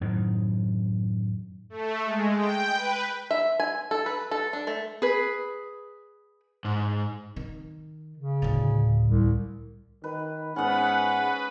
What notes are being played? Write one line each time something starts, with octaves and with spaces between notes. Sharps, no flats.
F#2 A2 D#3
A3
G#3
G5
B4
E5
G#5
A4
B4
A4
D4
A3
G#4 B4
G#2
D#3
C#3
D2 A2
C2
D#3 B4
G#2 B3 C#4 B4 F#5